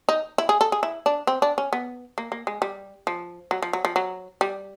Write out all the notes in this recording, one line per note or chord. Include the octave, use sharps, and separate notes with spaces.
D#4
E4
G#4
A4
G#4
E4
D4
C4
D4
C#4
B3
A#3
A#3
G#3
G3
F3
F#3
F3
F#3
F3
F#3
G3